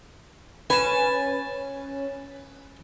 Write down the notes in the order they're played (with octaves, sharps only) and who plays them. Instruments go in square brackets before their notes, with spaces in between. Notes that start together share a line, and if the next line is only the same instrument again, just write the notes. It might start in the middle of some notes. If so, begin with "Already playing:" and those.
[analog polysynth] C#4 [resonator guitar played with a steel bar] B4 [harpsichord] G#5 A5